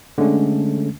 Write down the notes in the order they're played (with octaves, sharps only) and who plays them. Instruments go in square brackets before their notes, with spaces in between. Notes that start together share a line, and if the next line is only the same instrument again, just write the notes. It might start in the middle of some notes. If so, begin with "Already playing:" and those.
[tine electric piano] D3 G#3 A3 C#4 D4